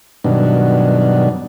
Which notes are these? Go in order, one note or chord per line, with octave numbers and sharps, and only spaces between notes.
G2 B2 D#3 F#3 D4